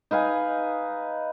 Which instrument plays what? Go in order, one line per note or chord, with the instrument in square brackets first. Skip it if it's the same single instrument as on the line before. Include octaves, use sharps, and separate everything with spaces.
[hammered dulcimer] D#4 B4 F5 G#5